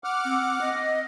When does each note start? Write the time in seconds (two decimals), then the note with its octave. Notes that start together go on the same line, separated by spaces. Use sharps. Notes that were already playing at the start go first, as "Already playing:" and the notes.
0.04 F#5 D6 F6
0.25 C4
0.61 D#5